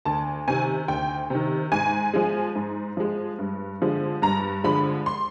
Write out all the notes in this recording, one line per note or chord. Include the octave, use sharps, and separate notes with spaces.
D2 A5
C3 D#3 G#5
D2 G5
C3 D#3
G#2 G#5
F3 G#3
G#2
F3 G#3
G2
D3 F3 G#3
G2 A#5
D3 F3 G#3 B5
C6